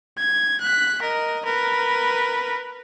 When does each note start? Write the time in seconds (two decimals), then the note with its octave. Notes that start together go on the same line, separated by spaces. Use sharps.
0.18 G#6
0.61 F#6 B6
1.02 A#4 D#5
1.45 A#4 B4